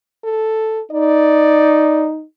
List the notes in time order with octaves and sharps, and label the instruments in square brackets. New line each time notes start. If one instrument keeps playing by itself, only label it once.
[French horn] A4
[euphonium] D#4 [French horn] D5